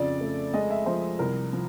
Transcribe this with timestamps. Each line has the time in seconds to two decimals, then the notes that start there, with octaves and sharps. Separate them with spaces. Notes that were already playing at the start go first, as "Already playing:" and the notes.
Already playing: F2 C#3 D5
0.21 A3
0.54 G#3 D#5
0.70 E5
0.86 F3 C5
1.19 C2 A#4
1.53 F3